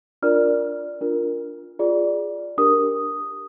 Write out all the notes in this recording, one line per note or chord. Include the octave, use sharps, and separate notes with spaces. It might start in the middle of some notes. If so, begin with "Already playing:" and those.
D4 F4 A#4 D5 F6
D4 F4 A#4
F4 G#4 D5
D4 G4 A#4 D#6